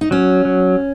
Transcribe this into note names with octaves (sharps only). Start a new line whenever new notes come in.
D#4
F#3 C#4
F#3